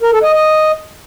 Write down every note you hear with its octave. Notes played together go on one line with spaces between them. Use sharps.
A#4
A4
D#5
D#5